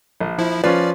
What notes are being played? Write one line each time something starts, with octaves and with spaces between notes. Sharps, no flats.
A#1
F3 E4
F3 C#4 F4 B4 D5